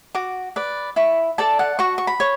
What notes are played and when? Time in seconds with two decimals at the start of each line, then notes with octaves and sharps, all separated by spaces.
0.15 F#4 D6
0.56 B4 D5
0.96 E4 C#6
1.38 A4 D5 A5
1.59 F#5
1.79 F#4 C#6
1.98 C#6
2.07 B5
2.20 C#5